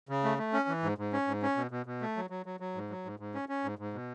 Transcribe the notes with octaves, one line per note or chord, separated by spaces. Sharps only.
C#3
A3
A3
C#4
E3
G#2
G#2
C#4
G#2
C#4
B2
B2
B2
A3
F#3
F#3
F#3
F#3
G#2
F#3
G#2
G#2
C#4
C#4
G#2
G#2
B2